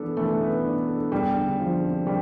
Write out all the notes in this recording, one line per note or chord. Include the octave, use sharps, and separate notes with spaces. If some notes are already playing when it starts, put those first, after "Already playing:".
Already playing: E3 B3 D4 A4
E3 A3
B3
D4
A4
E2 G3
D3
F3
C4
G3